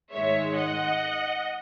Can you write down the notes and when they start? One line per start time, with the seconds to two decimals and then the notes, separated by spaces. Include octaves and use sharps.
0.11 G#2 D#3 G#3 C#5 E5
0.55 D#5 F#5